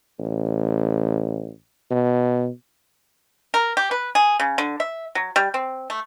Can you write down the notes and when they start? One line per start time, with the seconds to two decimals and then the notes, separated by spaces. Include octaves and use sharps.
0.19 A1
1.91 B2
3.54 A#4
3.77 G4
3.91 B4
4.15 G#4
4.40 C#3
4.58 D3
4.80 E5
5.15 F#3
5.36 G3
5.54 C4
5.90 A3